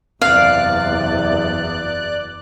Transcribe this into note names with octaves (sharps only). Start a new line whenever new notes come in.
F#1 E2 C3 D5 F5 F#6